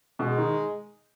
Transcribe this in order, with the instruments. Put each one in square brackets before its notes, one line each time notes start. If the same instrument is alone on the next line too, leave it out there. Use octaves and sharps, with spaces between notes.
[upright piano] B2 [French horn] G#3
[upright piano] D#3